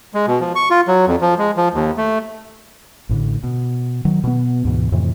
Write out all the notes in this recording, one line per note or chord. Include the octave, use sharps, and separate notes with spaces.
G#3
B2
F3
C#6
F4
F#3
F2
F3
G#3
F3
D#2
A3
A1 A2 D3
B2
D#3 F#3
B2 B3
D2 G#2 B2 E3
F2 A2 C3 E3